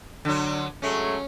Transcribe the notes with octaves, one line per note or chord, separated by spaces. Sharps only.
D3 F#3
F#3 G#3 A3 C#4